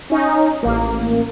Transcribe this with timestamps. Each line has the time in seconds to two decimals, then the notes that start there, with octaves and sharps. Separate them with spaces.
0.10 C#4 D#4
0.63 A1 A#3